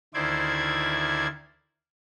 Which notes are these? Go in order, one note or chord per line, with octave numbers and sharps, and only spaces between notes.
D2 D#3 E4 C5 D5 G#6